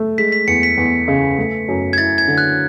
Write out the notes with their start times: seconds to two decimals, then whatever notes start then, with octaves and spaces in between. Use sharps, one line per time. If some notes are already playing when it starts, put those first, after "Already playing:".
Already playing: A3
0.18 G#3 B6
0.32 B6
0.47 E2 C#7
0.63 B6
0.77 E2
1.08 C#3
1.38 A3
1.68 F#2
1.93 G#6
1.98 E4 A6
2.18 G#6
2.28 D3
2.38 F#6